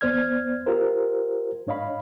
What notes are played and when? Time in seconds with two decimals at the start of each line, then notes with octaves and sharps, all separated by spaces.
0.01 E2 B3 C5 D5 F6 G#6
0.66 F4 G4 A#4 C5
1.67 G#2 D4 C#5 D#5 F5 B5